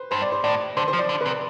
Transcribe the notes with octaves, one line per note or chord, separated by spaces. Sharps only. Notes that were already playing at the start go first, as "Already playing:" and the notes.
Already playing: B4 C5
G2 C5
D5
C5
A2 D5
D3 C5
C5
F3
D5
D3
B4
C3